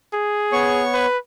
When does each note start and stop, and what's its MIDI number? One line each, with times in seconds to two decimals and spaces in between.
0.13 0.84 68
0.52 1.06 59
0.52 1.06 73
0.52 1.06 85
0.93 1.17 71